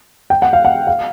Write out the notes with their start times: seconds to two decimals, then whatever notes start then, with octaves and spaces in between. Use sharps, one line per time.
0.30 G5
0.42 F#5
0.53 F5
0.65 F#5
0.87 F5